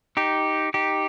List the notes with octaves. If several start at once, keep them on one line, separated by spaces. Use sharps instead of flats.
D#4 G4
D#4 G4